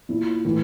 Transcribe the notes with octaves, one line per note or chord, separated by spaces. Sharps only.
A#2 E4
A2 E3